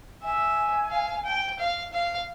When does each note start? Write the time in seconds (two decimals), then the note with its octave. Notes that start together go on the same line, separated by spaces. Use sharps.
0.22 E5 G#5
0.90 F5
1.25 G5
1.59 F5
1.93 F5